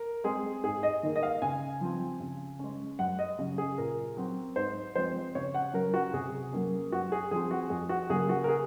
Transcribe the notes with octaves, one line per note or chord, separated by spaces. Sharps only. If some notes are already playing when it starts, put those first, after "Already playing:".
Already playing: A#4
G#3 C4 G#4
G#2 G#4
D#5
D#3 A#3
D#5
F5
C#3 G#5
F3 C4
C#3
G#3 C#4
F#2 F#5
D#5
C#3 F#3 C#4
G#4
A#2 A#4
F#3 C4
G#2 C5
F3 G#3 C4 C5
C#3 C#5
F#5
F#3 C#4 A#4
F#4
C3 G#4
F#3 A#3 C#4
F#2 F#4
G#4
F3 C4 G#4
F#4
F2 G#4
F#4
C#3 F#3 A#3 G#4
F#4
A#4
G#4